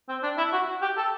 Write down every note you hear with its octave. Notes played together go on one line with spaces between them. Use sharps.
C4
D4
E4
F#4
G4
A4